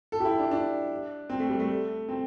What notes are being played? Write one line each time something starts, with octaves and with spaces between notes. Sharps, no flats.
A4
G4
E4
D4
D4
C4
A3
G3
A3
C4